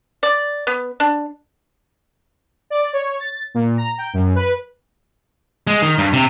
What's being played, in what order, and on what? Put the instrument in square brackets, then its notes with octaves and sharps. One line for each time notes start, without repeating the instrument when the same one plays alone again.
[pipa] D5
B3
D4
[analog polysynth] D5
C#5
A6
A#2
A#5
G5
F#2
B4
[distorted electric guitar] G#3
D#3
G2
C3